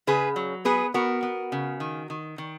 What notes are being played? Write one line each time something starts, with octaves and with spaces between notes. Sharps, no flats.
C#3 G#4 B4
F#3
B3 G#4 B4
B3 F#4 A#4
B3
C#3
D#3
D#3
D#3